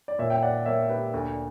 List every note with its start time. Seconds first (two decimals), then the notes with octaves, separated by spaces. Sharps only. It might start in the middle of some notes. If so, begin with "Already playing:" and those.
0.08 D5
0.19 A#2 C#5 E5
0.30 G5
0.43 D5 F#5
0.66 A#3 C#5 E5
0.89 G4 B4
1.14 D2